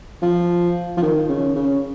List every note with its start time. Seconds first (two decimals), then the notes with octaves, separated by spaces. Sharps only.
0.22 F3
0.97 F3
1.03 D#3
1.29 C#3
1.56 C#3